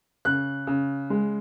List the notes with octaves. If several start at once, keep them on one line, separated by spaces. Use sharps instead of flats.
C#3 F#6
C#3
G#3